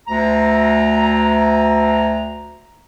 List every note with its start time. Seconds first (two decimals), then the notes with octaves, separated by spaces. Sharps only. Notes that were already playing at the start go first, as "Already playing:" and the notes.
0.08 D2 A#5